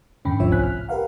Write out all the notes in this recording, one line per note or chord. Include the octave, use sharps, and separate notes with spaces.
E2 G#2 D3 C#4 G5 B5
G#1 D#2 F3 F4 C#5 E5
C2 A2 C4 G#5 F#6 B6
F6
G4 A#4 B4 F5 F#5